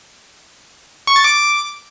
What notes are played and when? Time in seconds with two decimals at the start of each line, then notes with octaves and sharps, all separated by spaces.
1.07 C#6
1.16 A6
1.24 D6